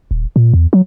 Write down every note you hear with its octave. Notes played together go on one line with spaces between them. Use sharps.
D#1
A#2
E2
F#3